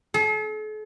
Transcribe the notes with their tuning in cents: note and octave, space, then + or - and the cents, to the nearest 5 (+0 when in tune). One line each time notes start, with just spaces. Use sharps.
A4 -45